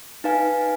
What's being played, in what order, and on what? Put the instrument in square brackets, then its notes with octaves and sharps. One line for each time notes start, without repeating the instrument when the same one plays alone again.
[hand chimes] D#4 B4 F5 G#5